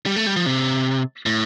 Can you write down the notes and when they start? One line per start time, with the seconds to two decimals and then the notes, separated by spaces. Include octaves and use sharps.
0.06 G3
0.16 A3
0.26 G3
0.36 F3
0.46 C3
1.26 A2